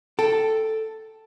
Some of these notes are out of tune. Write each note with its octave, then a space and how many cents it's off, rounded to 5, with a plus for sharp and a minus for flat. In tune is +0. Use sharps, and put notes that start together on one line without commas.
A4 +0 G5 +0